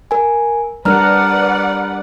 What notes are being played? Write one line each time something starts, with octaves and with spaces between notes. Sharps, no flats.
A#4 G#5
G3 D4 A#4 B4 D5 F#5 A#5 F6